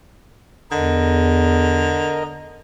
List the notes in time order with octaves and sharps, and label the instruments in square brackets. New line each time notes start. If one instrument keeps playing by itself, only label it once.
[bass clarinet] E2 [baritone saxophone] D3 [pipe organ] A#4 D#5